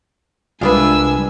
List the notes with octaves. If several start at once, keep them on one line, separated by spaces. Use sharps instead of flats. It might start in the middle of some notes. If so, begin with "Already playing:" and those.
C2 G#3 D4 F4 G4 B4 G#5 E6